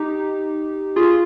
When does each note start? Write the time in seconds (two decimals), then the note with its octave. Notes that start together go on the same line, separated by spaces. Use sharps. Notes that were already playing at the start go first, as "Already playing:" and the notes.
Already playing: D#4 G4
0.96 F4 G#4